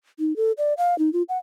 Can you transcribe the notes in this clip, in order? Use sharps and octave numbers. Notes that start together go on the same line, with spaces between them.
D#4
A4
D5
F5
D#4
F4
F#5